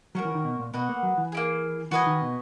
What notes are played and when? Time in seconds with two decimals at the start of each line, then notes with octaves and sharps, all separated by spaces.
0.15 F#3 C#4 F#4 A#4
0.25 E3
0.35 D#3
0.45 B2
0.59 A#2
0.74 B2 F#4 B4 D#5 F#5
0.89 A#3
1.03 F#3
1.17 E3
1.32 A#3 E4 G#4
1.91 E3 F#4 B4 D#5 G#5
2.06 D#3
2.22 B2